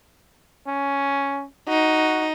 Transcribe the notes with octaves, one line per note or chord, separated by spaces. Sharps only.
C#4
D#4 F#4